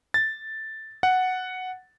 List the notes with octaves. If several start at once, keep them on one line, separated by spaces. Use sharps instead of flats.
A6
F#5